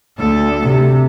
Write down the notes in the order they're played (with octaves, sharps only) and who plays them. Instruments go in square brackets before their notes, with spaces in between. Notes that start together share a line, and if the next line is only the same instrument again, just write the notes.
[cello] D2 A4
[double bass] C3